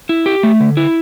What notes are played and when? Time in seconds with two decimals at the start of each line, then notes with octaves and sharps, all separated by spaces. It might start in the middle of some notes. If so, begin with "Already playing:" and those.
0.09 E4
0.26 G4
0.43 A3
0.60 D3
0.77 E4